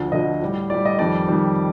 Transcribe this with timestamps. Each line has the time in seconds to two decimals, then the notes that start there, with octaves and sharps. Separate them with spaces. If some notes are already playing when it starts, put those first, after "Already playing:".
Already playing: D2 D3 F3
0.12 D2 D3 F3 D#5
0.41 A2 G3
0.70 A2 G3 D5
0.85 D#5
0.99 F2 D#3 G3 D5
1.28 F2 D#3 G3